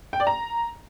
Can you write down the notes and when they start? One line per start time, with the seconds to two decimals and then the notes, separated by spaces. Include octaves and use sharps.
0.13 G5
0.20 D5
0.27 A#5